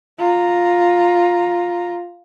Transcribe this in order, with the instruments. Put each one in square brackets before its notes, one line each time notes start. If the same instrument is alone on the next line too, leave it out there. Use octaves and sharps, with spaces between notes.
[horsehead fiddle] F4 A#5